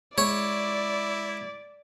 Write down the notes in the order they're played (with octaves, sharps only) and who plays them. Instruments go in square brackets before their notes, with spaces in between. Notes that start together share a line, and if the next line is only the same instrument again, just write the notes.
[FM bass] G#3 [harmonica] E4 [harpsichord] C#5 [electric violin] D5